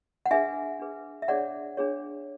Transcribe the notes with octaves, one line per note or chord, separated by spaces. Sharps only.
F#5
D4 G#4 B4 E5 G#5
D4 G#4 B4
E5
D4 G#4 C#5 D5 F#5
D4 G#4 C#5